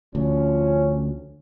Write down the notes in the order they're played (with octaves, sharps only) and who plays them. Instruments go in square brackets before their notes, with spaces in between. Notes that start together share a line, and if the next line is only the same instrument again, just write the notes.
[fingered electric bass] D2 [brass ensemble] F3 C#4